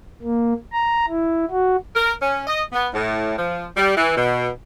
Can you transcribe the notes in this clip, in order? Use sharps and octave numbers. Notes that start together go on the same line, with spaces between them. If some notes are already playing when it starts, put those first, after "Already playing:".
A#3
A#5
E4
F#4
A#4
C#4
D#5
B3
A2
F3
G3
E3
B2